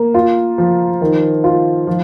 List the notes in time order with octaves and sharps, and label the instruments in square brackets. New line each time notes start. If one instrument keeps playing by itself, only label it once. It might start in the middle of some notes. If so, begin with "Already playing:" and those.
Already playing: [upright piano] A#3
F4
F3
D#3
F4
F3